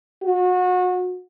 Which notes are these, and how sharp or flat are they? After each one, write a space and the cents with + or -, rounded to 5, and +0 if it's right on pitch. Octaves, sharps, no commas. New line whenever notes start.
F#4 -30